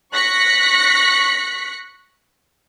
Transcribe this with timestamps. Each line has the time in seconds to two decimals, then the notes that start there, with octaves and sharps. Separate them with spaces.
0.13 C#6 F#6 A#6 B6 C#7